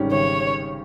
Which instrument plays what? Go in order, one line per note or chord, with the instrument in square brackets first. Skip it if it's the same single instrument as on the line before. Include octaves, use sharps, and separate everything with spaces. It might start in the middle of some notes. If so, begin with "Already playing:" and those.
Already playing: [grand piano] G#1 G#2 D#3 G3 C#4
[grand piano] G#1 [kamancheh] C#5